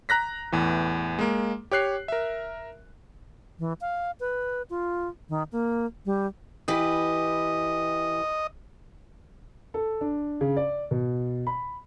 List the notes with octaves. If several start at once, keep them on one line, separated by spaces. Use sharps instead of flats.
A#5 F#6 A#6 B6
E2 A2 E3
G#3 A#3
G4 C#5 F#6 C7
A#4 E5
E3
F5
B4
F4
D#3
A#3
G3
E3 G4 B4 D#5
A4
D4
C#3
D5
B2
B5